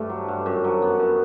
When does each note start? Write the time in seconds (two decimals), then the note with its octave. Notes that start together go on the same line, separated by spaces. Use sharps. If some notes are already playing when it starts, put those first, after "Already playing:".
Already playing: G2 A3
0.09 F#3
0.28 G2
0.46 F#2
0.64 F#3
0.82 B3
0.99 F#2